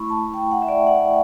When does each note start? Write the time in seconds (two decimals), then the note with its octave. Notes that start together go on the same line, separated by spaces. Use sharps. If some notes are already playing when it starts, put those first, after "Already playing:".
Already playing: A3 E4 B5 C#6
0.10 A5
0.34 G5
0.51 F#5
0.62 E5
0.68 D5
0.87 F#5